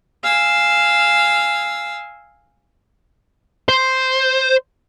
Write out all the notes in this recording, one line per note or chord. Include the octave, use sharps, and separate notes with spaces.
F5 G#5 E6
C5